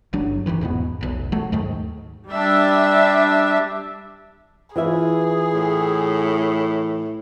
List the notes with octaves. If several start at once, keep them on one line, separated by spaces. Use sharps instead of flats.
G1 F#3 D4
F#1 B1 D#3 E3
E2 G#2 B2 B3
F1 B1
F#3 A3
D#2 G#2 D#3 A3
G3 D4 E5
E3 F4 G#4 E5
A2